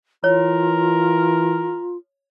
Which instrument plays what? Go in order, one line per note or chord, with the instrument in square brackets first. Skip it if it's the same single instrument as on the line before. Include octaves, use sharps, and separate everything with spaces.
[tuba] E3 [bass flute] F4 [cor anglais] A#4 [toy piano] C#5